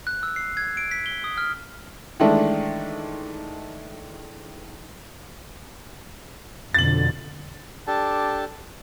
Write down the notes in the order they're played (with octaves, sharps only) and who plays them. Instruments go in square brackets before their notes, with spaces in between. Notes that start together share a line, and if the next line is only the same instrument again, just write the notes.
[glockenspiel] F#6
E6
C7
G#6
D7
B6
G7
D#6
F6
[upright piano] D#3 E3 G#3 A3 D4
[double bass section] F2 B2 D3 [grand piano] A6 F#7
[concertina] D4 G4 A4 A5